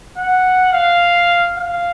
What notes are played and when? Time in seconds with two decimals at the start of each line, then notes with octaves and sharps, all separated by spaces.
0.17 F#5
0.73 F5
1.57 F5